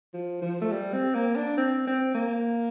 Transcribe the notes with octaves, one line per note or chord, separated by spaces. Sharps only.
F3
F3
A3
G3
C4
A#3
D4
C4
C4
A#3